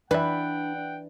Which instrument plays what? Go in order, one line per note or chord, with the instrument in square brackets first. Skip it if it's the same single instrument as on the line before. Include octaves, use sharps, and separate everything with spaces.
[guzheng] E3 [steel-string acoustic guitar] D4 [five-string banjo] B4 E5 [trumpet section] F#5 G5